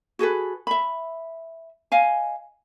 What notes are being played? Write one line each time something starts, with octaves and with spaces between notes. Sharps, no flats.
F#4 G#4 A4 B4
E5 B5
D#5 F5 G#5